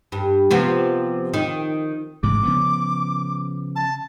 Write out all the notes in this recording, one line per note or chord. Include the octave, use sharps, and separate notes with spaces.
G2
C3 F3 B3
D#3
A1 G#2 C#3 D6
C#3 F3 B3
A5